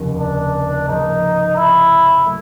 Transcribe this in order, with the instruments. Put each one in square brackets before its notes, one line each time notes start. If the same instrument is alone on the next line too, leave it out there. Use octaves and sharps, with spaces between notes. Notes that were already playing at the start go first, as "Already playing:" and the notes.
Already playing: [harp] F1 D#2 C#3
[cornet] D4
[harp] G#2 F3 A#3 [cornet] D#4
[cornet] E4
[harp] F#3 A3